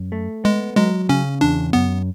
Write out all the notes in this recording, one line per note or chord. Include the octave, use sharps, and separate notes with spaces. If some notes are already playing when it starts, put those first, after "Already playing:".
Already playing: F#2
A3
G#3 B3
F#3 G#3
C#3 C#4
E2 D4
F#2 B3